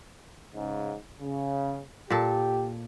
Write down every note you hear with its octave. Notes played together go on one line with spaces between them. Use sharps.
G#2 C#3
C#3
A#2 G4 A4